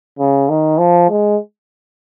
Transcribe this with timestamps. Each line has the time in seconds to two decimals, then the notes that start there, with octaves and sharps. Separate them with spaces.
0.19 C#3
0.49 D#3
0.79 F3
1.10 G#3